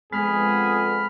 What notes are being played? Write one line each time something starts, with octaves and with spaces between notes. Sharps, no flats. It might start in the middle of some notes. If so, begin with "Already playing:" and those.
F2 G#3 B3 G#4 B5 F6